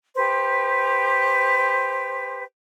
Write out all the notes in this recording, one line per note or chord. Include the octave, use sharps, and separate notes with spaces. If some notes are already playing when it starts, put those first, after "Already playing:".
G4 B4 C5